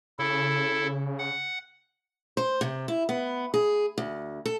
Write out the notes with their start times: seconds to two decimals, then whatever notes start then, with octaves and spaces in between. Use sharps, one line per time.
0.19 C#3 E4 A4
1.19 F#5
2.37 C5
2.61 C3
2.88 E4
3.09 B3
3.54 G#4
3.98 D2
4.46 A4